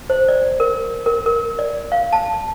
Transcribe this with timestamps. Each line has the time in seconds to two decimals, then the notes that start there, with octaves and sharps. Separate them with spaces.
0.10 C5
0.28 D5
0.60 A#4
1.06 A#4
1.26 A#4
1.59 D5
1.92 F5
2.13 A5